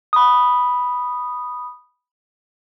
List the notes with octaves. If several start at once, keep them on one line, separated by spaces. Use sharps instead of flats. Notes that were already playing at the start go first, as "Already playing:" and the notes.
B5 D#6